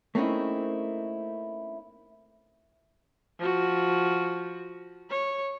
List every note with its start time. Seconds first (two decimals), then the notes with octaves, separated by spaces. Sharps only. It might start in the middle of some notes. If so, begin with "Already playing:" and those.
0.15 A3 A#3 C4 C#4 D#4 E4
3.39 F3 F#4
5.10 C#5